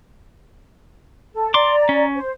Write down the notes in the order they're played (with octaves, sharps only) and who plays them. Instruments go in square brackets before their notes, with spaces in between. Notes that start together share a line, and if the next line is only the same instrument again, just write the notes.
[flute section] A4
[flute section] D5 A#5 [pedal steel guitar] C6 D6
[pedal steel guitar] C#4
[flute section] C5